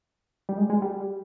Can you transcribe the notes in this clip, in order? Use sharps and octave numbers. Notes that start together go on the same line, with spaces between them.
G3
G#3
G#3
G3